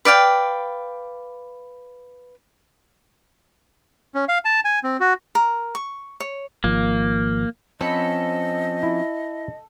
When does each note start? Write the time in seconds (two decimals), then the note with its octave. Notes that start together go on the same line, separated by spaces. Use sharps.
0.05 B4 D5 F5 G5
4.15 C#4
4.29 F5
4.45 A5
4.65 G#5
4.84 C4
5.00 F#4
5.35 A#4
5.75 C#6
6.20 C#5
6.64 G#1 F3 A#3
7.81 F3 C4 C#4 A4 D#5 B5
8.83 E4